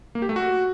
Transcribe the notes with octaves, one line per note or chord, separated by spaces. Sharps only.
A#3
G4
A3
F#4